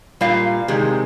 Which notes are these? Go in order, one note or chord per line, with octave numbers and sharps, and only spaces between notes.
A#2 G3 F5
C3 D#3 G#3